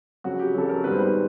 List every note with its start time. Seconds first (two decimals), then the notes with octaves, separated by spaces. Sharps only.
0.24 F2 C#3 F#3 F#4
0.39 G4
0.54 F2 C#3 F#3 A4
0.69 A#4
0.84 G#2 D#3 G3 B3 B4
0.92 C5
0.98 B4